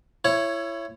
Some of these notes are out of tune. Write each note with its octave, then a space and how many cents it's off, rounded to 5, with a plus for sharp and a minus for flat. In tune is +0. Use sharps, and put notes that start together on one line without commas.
E4 +25 C#5 +0